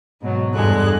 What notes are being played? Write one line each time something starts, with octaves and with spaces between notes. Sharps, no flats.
G#2 B2 F#3
E2 G2 D3 G#3 F#6